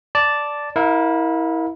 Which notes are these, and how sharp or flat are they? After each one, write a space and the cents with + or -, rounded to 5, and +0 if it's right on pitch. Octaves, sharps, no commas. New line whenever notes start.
D5 -5 A5 +0
E4 -20 A#4 +0 F5 +35